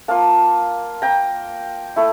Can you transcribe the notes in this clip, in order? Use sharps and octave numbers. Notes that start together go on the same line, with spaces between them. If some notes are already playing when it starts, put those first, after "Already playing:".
A#3 F4 F5 A5
G5 A#5
A3 E4